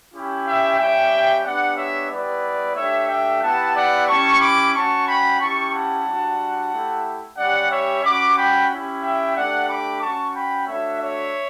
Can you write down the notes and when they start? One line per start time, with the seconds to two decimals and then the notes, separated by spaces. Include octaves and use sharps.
0.13 C#4 E4 G4
0.45 E5 G5
0.78 G3 C#4 G4 E5 G5
1.44 B3 D4 G4 D5 F#5
1.77 C#5 E5
2.10 G3 B3 E4 G4 B4 D5
2.76 A3 D4 G4 C#5 E5
3.09 E5 G5
3.41 B3 E4 G4 F#5 A5
3.75 D5 F#5
4.08 C#4 E4 G4 A5 C#6
4.41 B5 D6
4.73 C#4 F#4 A5 C#6
5.07 G5 B5
5.39 C#4 E4 G4 A5 C#6
5.73 F#5 A5
6.06 G3 D4 F#4
6.71 A3 E4 G4
7.37 G3 C#4 G4 D5 F#5
7.70 C#5 E5
8.03 C#4 F#4 B5 D6
8.37 G5 B5
8.70 C#4 E4 G4
9.02 E5 G5
9.35 A3 D4 G4 D5 F#5
9.68 B5 D6
10.01 C#4 F#4 A5 C#6
10.34 G5 B5
10.67 A3 D4 F#4 C#5 E5
11.00 C#5 E5